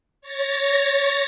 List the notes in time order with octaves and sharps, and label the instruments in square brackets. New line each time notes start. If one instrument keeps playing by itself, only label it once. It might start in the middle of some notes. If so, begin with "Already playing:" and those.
[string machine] C#5 A6 A#6